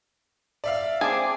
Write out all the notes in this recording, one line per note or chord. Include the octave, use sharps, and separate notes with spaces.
D5 E5 F5
C4 G#4 A5 D6